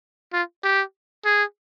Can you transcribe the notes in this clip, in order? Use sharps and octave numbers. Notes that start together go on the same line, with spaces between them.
F4
G4
G#4